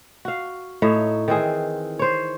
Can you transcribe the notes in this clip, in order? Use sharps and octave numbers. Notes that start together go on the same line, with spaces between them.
F#4 F5
A2 D#4 C#5 E5
D#3 E3 C4 G#4
C5 C#5